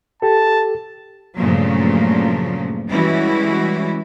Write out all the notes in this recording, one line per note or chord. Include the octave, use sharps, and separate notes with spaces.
G4 A4 A5
G2 A#2 C#3 F3 F#3 A3
E3 G3 G#3 C#4 E4 F#4